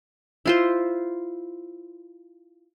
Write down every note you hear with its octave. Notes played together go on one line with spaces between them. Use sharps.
E4 F4 C5